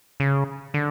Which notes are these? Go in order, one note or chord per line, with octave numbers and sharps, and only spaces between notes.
C#3
D3